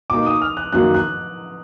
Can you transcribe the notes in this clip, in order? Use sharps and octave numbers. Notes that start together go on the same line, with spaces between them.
B2 A#3 D#4 D6
D#6
F6
F#6
F#2 D#3 F#3 A#3 F#6
F#6